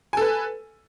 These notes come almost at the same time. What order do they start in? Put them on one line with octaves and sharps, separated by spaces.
G#5 A4 B4